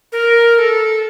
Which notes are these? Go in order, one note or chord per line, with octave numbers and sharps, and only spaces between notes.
A#4
A#4
A4